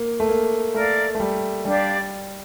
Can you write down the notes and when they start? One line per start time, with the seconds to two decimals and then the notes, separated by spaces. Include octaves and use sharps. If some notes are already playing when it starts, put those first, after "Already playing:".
Already playing: A#3
0.20 A3
0.29 A#3
0.74 A3 A#4 D5 F5
1.15 A3
1.20 G3
1.65 G3 D4 G4 D5 F5